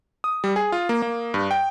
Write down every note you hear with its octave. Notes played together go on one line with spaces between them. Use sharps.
D#6
G3
G#4
F4
A#3
A#3
G2
G5